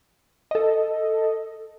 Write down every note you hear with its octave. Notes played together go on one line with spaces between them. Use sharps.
A4 D#5